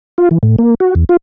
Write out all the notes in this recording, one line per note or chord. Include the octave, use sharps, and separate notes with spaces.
F4
E3
A2
A#3
F#4
E2
F4